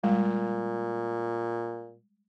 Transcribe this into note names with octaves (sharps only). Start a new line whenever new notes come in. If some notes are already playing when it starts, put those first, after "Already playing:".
A#2 G3 G#3